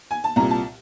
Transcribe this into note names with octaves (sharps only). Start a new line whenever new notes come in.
G#5
A5
C2 A#2 A#5
A5